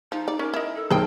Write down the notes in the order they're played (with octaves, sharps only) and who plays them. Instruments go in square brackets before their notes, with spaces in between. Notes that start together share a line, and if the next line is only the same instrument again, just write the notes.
[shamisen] F3 [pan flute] D#4
[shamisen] D5
[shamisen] C#4 [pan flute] A#4
[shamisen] D#4 E4
[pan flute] A4
[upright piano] B1 [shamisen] G#4 C5 G5 [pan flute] A#4